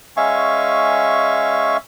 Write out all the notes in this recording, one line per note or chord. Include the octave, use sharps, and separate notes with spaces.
G#3 C#4 E5 F5 G#5 C#6